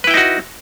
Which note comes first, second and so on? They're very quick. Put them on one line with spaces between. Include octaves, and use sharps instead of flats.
B4 E4 G5 D#4 F#4